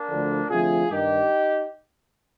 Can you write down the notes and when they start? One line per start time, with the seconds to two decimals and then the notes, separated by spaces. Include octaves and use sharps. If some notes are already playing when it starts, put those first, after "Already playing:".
Already playing: A#3 D4
0.10 D2 D3 F3
0.49 D2 C3 F3 F4 G#4
0.89 G2 D#3 D#4 G4